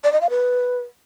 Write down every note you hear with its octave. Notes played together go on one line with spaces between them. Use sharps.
D5
D#5
F5
B4